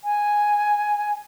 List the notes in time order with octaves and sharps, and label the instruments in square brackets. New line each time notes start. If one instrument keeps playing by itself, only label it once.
[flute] G#5